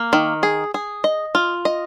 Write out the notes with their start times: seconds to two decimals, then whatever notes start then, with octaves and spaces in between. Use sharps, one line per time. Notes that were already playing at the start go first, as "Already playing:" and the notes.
Already playing: A#3
0.13 D#3
0.43 G#4
0.74 G#4
1.04 D#5
1.35 F4
1.65 D#5